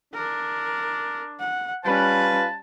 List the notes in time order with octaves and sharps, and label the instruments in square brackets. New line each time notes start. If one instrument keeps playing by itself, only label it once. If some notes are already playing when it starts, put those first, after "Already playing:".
[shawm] D4 [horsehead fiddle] A#4
[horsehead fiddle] F#5
[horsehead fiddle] G3 C#4 [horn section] F4 B4 [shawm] A5